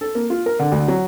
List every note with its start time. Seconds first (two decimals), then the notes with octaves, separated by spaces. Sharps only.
0.01 A4
0.15 A#3
0.30 F4
0.46 A#4
0.59 D3
0.72 D2
0.88 F#3